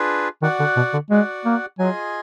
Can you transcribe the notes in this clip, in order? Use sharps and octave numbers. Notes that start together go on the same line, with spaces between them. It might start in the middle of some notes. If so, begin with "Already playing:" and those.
Already playing: D4 F4 G#4 B4
D#3 F#4 D5 F#5
D3
B2
D3
G#3 F#4 D5 F#5
A#3
F#3 F4 G#4 D#5 G#5